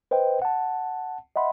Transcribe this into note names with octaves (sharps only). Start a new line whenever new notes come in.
B4 C5 D#5 G5
F#5 A5
D#5 E5 F#5 B5 C6